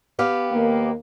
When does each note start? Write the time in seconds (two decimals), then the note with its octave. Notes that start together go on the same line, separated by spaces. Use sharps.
0.19 B3 G4 F5
0.51 D#2 A#3